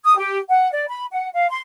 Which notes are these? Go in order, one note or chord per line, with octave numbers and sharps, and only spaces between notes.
D#6
G4
F#5
D5
B5
F#5
F5
C6